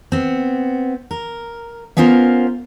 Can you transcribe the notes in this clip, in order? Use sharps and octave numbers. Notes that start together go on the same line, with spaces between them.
B3 C4
A#4
B3 C#4 F4 A#4 C5